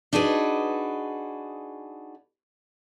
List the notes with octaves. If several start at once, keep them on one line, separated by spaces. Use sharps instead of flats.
D4 D#4 F#4 G#4 B4